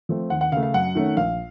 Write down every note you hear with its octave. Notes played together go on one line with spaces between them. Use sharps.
F3 A3 C4
D#2 F#5
F#5
C#3 A3 F5
F5
F#2 F#5
D#3 A3 C#4
A#1 F5